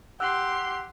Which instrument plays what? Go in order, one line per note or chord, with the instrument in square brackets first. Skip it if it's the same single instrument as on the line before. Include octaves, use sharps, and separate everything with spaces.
[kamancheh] G4 C6 [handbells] F#5 E6 F#6